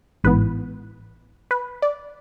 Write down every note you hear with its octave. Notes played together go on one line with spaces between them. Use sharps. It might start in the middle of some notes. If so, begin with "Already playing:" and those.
A1 G#2 E3 B3 B4
B4
D5